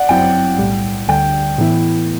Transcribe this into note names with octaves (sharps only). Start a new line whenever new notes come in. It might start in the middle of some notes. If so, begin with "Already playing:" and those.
Already playing: D5 F#5
G1 F#2 F#3 C4 E4 G5
B1 A2 G3
D2 D3 G3 G5
A2 E3 B3 E4